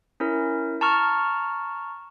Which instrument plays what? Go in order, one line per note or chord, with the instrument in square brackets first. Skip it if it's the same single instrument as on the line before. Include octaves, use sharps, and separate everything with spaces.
[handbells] C#4 E4 A#4
A5 A#5 C#6 F6